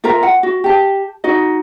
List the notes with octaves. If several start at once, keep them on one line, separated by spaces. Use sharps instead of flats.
F4 A#4 E5 A#5
F#5
F#4
G4 A5
D#4 F#4 D#5